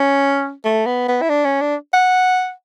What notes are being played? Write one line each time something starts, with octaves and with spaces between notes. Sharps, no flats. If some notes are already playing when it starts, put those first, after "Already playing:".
Already playing: C#4
A3
B3
B3
E4
D4
C#4
D4
F#5